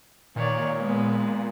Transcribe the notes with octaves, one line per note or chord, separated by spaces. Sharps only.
A#2 D#3 C#5 D5
G#3 B3